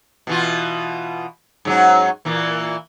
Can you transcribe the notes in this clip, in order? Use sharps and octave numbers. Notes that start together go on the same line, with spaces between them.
B2 E3 F4
G#2 F#3 C#4
A#2 E3 A#3